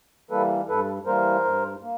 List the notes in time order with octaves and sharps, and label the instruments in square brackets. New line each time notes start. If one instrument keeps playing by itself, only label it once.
[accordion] E3 G3 A#3 A4 B4
G2 A4 B4
E3 G3 A#3 A#4 C5
G2
A#3